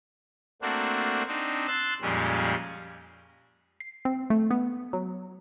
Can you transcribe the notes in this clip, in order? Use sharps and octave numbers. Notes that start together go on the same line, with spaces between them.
A3 A#3 C4 D4 F#4
C4 D4 D#4
C6 E6 F#6 A6
F2 A#2 G3 G#3 C#4
C7
C4
A3
B3
F#3